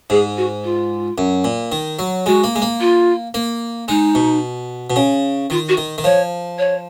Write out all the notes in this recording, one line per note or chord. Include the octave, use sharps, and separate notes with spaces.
G#2 G#4
F#4
F4
F#2
A#2
D#3
F#3
G#3 F#4
A#3
G#3
A#3
F4
A#3
G#3 D#4
B2
B2
C#3
D#3 F4
F#4
D#3
D#3
F3 C#5
C#5